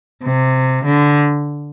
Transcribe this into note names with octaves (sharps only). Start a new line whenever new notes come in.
C3
D3